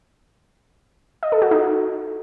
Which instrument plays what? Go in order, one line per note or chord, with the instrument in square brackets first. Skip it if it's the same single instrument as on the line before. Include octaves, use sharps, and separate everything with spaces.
[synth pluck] D#5
A4
F#4
D#4